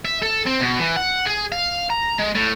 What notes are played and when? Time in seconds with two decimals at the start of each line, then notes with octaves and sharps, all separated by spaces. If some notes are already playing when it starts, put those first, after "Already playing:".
0.05 E5
0.22 A4
0.47 C4
0.61 B2
0.79 E3
0.96 F#5
1.26 G#4
1.52 F5
1.90 A#5
2.19 G#3
2.35 A2